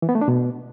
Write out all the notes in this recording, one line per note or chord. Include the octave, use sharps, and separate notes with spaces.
E3
B3
A3
D4
B2